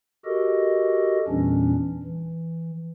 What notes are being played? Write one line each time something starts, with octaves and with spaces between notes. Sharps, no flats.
F#4 G4 A4 A#4 D#5
E2 A#2 E3 G3 C#4 D4
E3